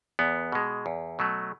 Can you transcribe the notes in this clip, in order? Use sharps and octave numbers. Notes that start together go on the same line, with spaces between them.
E2 B3
B2 G#3
E2
B2 F#3 A3